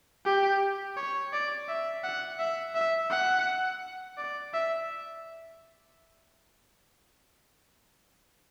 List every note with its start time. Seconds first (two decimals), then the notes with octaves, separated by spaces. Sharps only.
0.25 G4
0.97 C#5
1.33 D5
1.68 E5
2.04 F#5
2.39 E5
2.75 E5
3.11 F#5
4.18 D5
4.53 E5